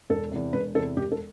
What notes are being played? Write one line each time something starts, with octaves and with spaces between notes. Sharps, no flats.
E1 A4
E2 C3
E1 B4
E2 C3 A4
E1 G4
A4